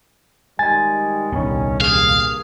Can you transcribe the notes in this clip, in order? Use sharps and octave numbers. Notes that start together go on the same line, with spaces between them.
D#3 G3 G#3 G#5 A6
D#1 C2 G2 D#3 B3 C#4
G2 A#3 G#4 F5